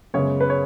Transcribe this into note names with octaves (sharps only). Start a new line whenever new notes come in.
F#2 C#3 G#3 B3 C#5
B4
C#5